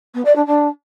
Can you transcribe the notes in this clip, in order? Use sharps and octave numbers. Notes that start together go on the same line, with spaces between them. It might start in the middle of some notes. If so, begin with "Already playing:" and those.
B3
D5
D4
D4